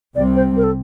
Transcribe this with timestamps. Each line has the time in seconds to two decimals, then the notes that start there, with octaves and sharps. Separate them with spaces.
0.15 C2 C3 G3 C4 D5
0.36 C5
0.57 A#4
0.63 A4